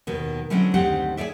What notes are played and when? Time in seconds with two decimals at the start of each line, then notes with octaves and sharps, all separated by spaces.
0.07 D#2 B2 D#3
0.50 D3 F#3 G#3 C4 C#4 E4
0.74 D2 G#2 D#3 C4 G4 F#5
1.17 G#4 A4 C#5 D5 E5